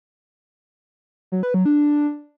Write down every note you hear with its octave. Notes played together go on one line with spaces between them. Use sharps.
F#3
B4
F#3
D4